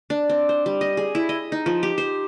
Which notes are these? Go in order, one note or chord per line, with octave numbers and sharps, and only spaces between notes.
D4
C4
C5
G3
D#5
G#4
E4
D#5
D#4
F3
G4
C5